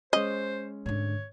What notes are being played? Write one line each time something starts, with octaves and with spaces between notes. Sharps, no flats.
G#3 C#4 C5 D#5
G#2 D3 C#5